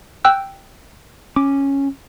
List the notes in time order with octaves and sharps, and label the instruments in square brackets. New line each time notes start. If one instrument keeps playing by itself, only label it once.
[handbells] G5 E6 F#6
[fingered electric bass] C#4 [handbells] D6